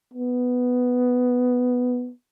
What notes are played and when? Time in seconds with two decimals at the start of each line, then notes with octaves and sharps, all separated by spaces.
0.14 B3